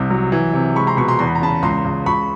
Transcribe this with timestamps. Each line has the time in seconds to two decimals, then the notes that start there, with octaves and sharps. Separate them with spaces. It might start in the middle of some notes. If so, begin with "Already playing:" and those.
Already playing: C2 C3
0.10 F#3
0.32 E3
0.54 C3
0.75 G#3 B5 C#6
0.87 A#5 C6
0.97 B2 B5 C#6
1.08 A#5 C6
1.19 E2 C6
1.27 B5
1.35 A#5
1.42 C#3 A5 B5
1.62 C#2 A#5 C6
1.85 C#2
2.06 C#2 B5 C#6